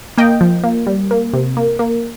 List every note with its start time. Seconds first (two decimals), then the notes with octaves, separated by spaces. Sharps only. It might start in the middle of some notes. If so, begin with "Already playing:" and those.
0.18 A#3 D#5 G5
0.41 F3
0.64 A#3
0.87 G3
1.11 A#3
1.33 C3
1.57 A#3
1.79 A#3